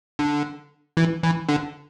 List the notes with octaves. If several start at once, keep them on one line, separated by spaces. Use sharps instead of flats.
D3
E3
E3
D3